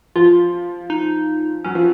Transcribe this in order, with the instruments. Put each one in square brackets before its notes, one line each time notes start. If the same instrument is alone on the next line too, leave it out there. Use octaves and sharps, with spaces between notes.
[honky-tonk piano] F3 [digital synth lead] F4
[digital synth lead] D#4
[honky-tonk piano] F#3 [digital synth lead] C#4
[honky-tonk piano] F3